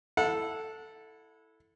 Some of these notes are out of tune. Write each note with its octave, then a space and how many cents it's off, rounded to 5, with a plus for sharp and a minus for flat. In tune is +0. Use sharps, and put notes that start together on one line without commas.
E4 +0 A4 +0 F#5 -30